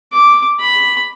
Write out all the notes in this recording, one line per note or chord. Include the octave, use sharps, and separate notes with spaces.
D6
B5